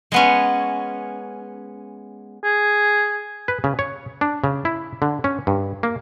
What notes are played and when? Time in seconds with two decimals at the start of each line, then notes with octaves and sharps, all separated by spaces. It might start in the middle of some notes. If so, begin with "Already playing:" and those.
0.12 G#3 B3 C#4
2.44 G#4
3.48 B4
3.64 C#3
3.79 C#5
4.21 D4
4.44 C#3
4.65 E4
5.02 D3
5.24 C#4
5.47 G2
5.83 A#3